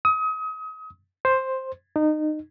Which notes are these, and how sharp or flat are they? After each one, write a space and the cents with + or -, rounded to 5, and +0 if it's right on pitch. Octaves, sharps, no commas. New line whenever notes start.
D#6 +35
C5 +5
D#4 -25